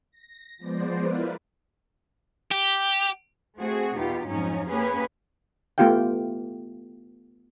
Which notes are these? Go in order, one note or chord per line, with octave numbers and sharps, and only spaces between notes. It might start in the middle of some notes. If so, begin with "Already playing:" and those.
A#6
F3 G#3 B3 C5 D5
E4 F4 A#4 B4
G4
A3 C4 F#4 G#4
E2 B2 D#4 F4 G4
F2 G#2 F3 F#3 C#4 D#4
A#3 C#4 G4 G#4 B4
A3 B3 F4 G4 F5 G5